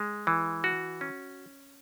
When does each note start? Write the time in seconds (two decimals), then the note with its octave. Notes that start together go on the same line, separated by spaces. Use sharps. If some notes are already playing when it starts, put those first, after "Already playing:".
Already playing: G#3
0.27 E3
0.64 F#4
1.01 C#4